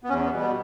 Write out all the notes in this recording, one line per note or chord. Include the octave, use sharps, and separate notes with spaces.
B3
E2 C#4
B3
B2 G3
B3